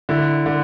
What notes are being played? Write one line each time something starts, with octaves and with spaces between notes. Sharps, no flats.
D3 E4
D3